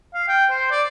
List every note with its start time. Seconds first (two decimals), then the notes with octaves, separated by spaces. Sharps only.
0.14 F5
0.28 G5
0.51 C5
0.71 D5